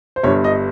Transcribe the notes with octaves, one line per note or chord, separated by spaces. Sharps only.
C5
G1 G2 G3 C#5
D#5